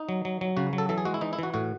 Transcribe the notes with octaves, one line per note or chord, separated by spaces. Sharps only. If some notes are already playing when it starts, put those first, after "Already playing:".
Already playing: D#4
F#3
F#3
F#3
C#3 F#4
F#3
A4
E3 A4
G#4
G#3 F#4
E4
E3 D#4
E4
E3 F#4
A2 F#4